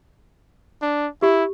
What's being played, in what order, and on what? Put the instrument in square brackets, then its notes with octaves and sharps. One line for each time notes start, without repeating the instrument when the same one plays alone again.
[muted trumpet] D4
[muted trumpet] E4 [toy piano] G4